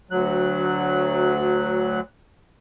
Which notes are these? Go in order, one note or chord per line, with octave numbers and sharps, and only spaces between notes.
D2 F#3 F#6